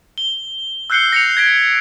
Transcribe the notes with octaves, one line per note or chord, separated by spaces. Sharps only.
G7
E6 F#6 G6 C7 C#7 G7
A#6 C#7 F7
G#6 A#6 B6 D7